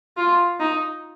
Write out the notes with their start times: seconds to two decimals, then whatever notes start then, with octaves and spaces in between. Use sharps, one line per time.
0.17 F4
0.60 D#4